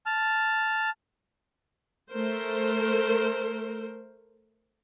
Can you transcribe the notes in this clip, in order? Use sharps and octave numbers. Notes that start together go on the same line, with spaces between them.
A5 F6
A3 A#4 C5